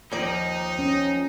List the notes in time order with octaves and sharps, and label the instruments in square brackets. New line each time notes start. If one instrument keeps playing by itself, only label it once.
[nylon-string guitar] D#2 F3 D5 [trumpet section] D#4
[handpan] C#4